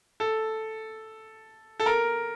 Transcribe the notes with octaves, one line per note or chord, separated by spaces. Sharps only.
A4
A4
A#4